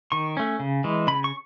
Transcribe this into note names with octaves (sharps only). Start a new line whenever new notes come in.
D#3 C#6
A3 C#4
C#3
E3 G#3
C#3 B5
C#6